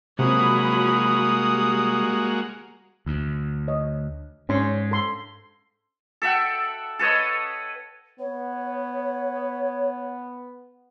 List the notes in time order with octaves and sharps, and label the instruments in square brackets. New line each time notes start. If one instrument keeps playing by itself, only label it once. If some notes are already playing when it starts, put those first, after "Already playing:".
[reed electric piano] C3 [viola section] F3 F#3 B5 [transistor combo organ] G#3 A#3 F#4 [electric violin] D#6
[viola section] G3
[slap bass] D2
[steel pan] C#5 D#5
[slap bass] G#2 [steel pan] C#4 D4 C6
[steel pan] A4 C6
[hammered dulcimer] A4 E5 F#5 G5
A4 B4 C#5 D#5
[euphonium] B3 [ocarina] C#5